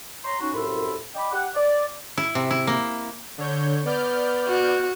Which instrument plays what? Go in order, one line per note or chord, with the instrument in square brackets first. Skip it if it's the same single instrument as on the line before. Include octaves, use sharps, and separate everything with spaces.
[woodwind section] C#5 A#5 C6
C#4 D#4 F#4
C2 F#2 A2 A4 B5 C6
D5 D#5 G5 B5 D6
G4 F#5
D5
[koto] E4
C3
E4
A#3
[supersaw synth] D3 C#5 G6
[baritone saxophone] B3 [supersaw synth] D5 F6 G6
[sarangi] F#4